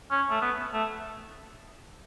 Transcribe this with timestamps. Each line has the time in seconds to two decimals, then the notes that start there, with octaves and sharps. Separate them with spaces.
0.11 C#4
0.30 A3
0.42 B3
0.74 A3